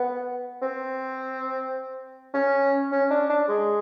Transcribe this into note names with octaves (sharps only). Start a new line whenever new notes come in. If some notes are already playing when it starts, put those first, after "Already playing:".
Already playing: B3
C4
C#4
C#4
D4
D4
G#3